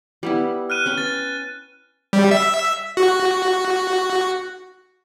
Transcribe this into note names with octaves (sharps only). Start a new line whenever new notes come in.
G3 B3 E4
F6 F#6 D#7
C#4 B4 G5
A6
G3
E5
F#4